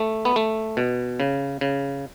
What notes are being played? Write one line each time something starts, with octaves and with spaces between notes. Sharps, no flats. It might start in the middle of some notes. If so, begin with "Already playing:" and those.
Already playing: A3
B3
A3
B2
C#3
C#3